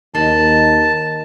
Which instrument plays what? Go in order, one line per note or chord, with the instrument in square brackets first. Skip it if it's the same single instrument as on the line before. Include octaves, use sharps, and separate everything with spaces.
[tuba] D#2 [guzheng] D#3 [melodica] A5